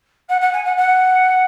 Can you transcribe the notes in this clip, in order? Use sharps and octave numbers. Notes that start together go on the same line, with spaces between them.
F#5
F#5
G#5
F#5
F#5